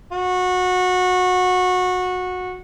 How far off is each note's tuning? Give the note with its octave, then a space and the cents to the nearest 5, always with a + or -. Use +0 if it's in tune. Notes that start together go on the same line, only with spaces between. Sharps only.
F#4 -20